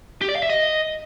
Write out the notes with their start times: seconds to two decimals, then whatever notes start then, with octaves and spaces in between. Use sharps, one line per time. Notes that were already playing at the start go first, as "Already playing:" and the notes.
0.22 G4
0.29 D5
0.36 F5
0.43 E5
0.50 D#5